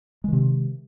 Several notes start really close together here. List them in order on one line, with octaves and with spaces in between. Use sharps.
G#3 D#3 C3